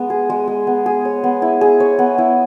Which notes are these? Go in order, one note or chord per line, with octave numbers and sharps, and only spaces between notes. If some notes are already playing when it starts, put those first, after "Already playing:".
Already playing: G#3 B3
G#4
G#3
G#3
B3
G#4
C#5
B3
E4
G#4
C#5
B3
E4